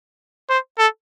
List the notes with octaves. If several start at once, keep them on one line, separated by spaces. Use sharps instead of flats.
C5
A4